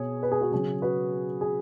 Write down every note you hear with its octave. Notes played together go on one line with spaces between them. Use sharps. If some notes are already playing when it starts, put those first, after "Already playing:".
Already playing: B2 B3 G#4 C#5
B4
G#4
F#4 B4
C#3 F#3 C#4 G#4
F#4 B4
G#4